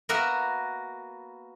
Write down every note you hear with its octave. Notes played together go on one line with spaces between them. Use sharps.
A#3 B3 F#4 A#4 E5 F#5